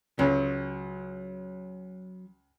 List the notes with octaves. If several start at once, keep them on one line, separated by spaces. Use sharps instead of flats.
C#2 F#3